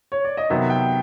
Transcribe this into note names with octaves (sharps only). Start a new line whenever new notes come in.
C#5
D5
D#5
C3 D#3 F#3 B3 E5
G5